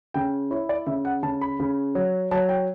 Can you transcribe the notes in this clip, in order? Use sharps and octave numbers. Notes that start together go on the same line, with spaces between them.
C#3 G5
E4 C#5
D5
C#3 E5
F#5
C#3 A5
B5
C#3
F#3
F#3 A5
G5